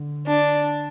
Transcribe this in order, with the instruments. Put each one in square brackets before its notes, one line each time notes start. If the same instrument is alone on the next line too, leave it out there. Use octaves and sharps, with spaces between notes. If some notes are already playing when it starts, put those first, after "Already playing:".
Already playing: [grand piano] D3
[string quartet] D4